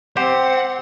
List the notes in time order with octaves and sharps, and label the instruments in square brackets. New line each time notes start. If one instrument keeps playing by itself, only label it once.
[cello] C4 [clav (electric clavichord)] G4 C5 [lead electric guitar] F#5